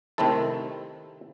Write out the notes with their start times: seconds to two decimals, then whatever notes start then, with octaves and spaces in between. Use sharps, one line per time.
0.18 C3 D#3 A3 C4 E4 A4